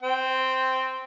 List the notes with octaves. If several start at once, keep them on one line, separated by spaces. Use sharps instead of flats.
C4 G5